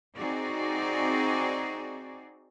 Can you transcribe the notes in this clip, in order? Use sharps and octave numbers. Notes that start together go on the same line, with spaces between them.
C4 D#4 F#4 G#4 D5